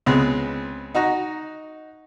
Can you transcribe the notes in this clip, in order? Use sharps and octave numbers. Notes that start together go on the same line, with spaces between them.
C#2 G#3 B3 C4
D#4 F#4 A#5